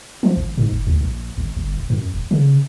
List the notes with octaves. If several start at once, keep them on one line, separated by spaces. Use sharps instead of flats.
F3
G#1
G#2
F#1
D2
A#1
G#1
G1
D1
F#2
D#1
C#3